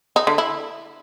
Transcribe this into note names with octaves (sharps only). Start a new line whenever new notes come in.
D#4
D3
E4